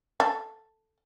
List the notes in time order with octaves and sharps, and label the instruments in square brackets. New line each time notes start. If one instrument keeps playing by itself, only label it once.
[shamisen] A4